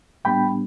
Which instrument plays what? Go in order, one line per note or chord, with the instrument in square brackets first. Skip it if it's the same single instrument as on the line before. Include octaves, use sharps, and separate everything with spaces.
[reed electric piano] A2 G3 B3 D4 G5 B5